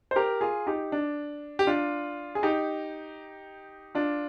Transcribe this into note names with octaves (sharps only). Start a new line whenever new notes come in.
C5
G4 A#4
F4 G#4
D#4 G4
D4
G4
D4 F4
G#4
D#4 G4
D4 F4